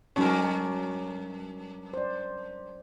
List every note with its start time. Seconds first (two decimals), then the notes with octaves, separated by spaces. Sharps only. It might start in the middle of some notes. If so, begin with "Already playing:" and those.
0.16 G2 F#3 C#4 A#4 C#5
1.94 C5 D5